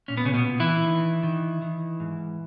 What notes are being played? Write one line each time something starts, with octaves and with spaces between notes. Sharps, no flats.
A#2 C#4
B3
C#3 C#4
B2 B3
A#2
E3 E4
D#3
D#3
D#3
G#2